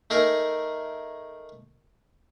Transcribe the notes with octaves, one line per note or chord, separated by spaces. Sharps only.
A3 D#4 G#4 A#4